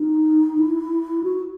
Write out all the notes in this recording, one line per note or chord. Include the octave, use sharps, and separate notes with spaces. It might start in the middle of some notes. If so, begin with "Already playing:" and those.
Already playing: D#4
E4
F#4